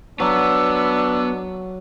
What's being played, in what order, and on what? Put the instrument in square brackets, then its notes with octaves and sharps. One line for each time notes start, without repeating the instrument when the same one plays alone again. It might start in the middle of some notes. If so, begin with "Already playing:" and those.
[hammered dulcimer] F#3 [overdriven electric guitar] B3 [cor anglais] D4 [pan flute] E6